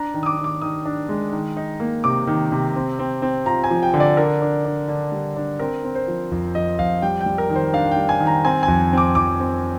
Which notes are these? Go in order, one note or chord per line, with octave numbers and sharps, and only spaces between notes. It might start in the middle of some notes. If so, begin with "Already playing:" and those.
Already playing: D4 A#5
D#3
D#6
D6
D#3
D6
D#3 D#6
D4
G#3
D#3
D#4
A#3
C3 D6
D#3
C3
C4
C4
C4
F4 A#5
G#5
F3
G5
D3
D5
D4 A#4
D4
D4
D3
G3
D4
C4 A#4
C4
C5
F3
F2
F3 D#5
F2 F5
G3 G5
G5
G3
A#4
D#3
C5
D4 F5
G5
G3
G#5
D#3
A#5
C4 G#5
G#5
F2
C4 D6
F2 D6
C4